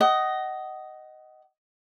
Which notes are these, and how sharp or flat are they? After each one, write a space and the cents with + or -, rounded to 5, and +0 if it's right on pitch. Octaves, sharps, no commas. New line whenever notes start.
D#5 +0 F#5 +30